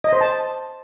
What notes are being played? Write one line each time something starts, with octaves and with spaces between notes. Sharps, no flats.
D#5
C5
A5